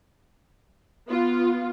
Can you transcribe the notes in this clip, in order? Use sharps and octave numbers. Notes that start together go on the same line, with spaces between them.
B3 F4